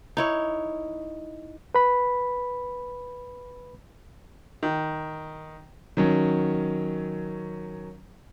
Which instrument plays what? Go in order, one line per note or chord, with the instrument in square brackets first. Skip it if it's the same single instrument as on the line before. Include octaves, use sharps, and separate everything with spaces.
[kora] D#4 E4 C#5
[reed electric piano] B4 B5
[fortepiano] D#3
[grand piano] D#3 F#3 C#4